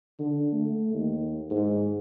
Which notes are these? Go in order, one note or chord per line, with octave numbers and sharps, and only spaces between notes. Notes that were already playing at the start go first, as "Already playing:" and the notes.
D3
A3
D#2
G#2